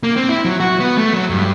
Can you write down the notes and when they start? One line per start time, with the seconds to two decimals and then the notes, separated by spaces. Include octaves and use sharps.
0.03 A#3
0.16 C4
0.29 E4
0.45 F#3
0.60 F#4
0.80 B3
0.98 A3
1.13 F#3
1.30 G2